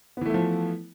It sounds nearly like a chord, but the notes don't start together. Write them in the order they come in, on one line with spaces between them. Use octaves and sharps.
B3 E3 A3 E4 F3